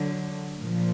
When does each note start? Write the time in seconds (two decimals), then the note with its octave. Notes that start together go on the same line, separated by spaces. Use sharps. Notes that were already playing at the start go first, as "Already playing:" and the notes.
Already playing: D3 F#3
0.59 A#2 F3